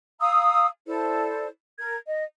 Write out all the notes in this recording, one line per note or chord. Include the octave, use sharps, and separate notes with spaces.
F5 A#5 D#6 E6
E4 A4 C5 D5
A#4 G#6
D#5